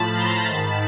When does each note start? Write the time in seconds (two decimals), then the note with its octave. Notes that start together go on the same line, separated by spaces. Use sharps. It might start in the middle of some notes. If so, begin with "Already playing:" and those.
Already playing: A2 F3 A5 B5
0.13 A#5 C6
0.46 G#2 D#3 A5 B5